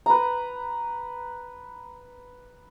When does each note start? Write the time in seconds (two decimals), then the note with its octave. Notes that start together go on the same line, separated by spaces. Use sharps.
0.06 B4 A#5